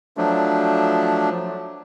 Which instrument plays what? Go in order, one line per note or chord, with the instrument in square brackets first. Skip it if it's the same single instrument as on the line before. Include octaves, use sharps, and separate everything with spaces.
[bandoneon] F3 F#3 A3 D4